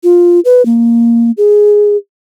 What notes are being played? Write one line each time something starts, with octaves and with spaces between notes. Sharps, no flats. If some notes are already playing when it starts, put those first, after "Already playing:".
F4
B4
A#3
G#4